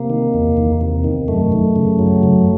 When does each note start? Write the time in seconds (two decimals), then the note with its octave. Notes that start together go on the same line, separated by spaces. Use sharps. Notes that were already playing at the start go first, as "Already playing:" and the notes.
Already playing: C3 A#3
0.10 D#3
0.34 E2
0.57 E2
0.81 C3
1.04 D#3
1.28 F#2 A3
1.52 F#2
1.76 C#3
1.99 F#3
2.23 F#2